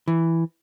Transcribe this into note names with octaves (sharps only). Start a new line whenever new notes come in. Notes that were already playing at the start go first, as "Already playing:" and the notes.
E3